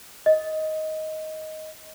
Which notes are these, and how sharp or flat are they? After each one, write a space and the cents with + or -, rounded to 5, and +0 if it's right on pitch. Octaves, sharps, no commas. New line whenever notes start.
D#5 +10